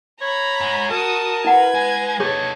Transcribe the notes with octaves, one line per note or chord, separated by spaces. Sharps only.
C#5 A#5 B5
G#2
F#4 A#4 A5 D#6
E4 B4 F#5 G#6
G#3
D#4 G#4 A4 C#5